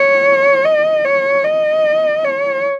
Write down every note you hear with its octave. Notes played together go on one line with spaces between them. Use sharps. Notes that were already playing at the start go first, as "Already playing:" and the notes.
Already playing: C#5
D#5
C#5
D#5
C#5